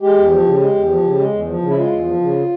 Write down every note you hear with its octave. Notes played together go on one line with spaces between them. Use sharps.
G#3 G4
E2
F3
C#3
G#3
E2
F3
C#3
G#3
E2
F3
C#3
E4
G#3 F4
E2
F3
C#3